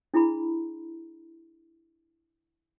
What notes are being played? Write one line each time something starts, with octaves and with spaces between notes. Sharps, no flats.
D4 E4 G#4 A#5 B5